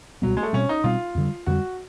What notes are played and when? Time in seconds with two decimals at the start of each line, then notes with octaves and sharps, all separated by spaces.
0.22 C#2 B2 F#3 G3 B3
0.37 G#3
0.43 A3
0.53 B2 G3 C4 C#4
0.69 D#4
0.84 B2 G3 C4 F4
1.15 F2 D3 G3
1.46 F2 D3 G3 F#4